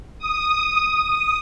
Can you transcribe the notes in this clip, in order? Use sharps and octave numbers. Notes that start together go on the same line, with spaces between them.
D#6